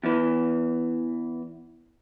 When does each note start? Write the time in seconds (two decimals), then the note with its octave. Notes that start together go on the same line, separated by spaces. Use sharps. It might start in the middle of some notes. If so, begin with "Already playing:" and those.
0.04 E2 E3